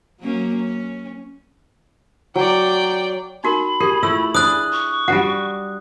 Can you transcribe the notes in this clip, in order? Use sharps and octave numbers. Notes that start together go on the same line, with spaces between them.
F#3 A#3 C#4
C#4
F#3 D5 G5
D#4 F#4 A#4 B5
G4 G#4 A#4
A3 E4 F4 E6
D4 G#4 D#6 F#6
C#6
G3 D4 F#4 F#5